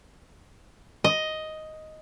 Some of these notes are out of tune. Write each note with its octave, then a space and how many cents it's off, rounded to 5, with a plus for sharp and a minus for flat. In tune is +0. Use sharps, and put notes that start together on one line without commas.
D#5 +5